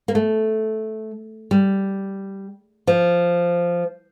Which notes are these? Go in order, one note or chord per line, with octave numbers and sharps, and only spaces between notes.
A#3
A3
G3
F3